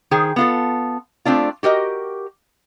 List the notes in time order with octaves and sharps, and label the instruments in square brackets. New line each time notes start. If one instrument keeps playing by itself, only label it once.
[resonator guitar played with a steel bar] D#3 G#4 C5 G5
B3 F4 A4
A3 C4 D4 F4
F#4 G4 A#4 D#5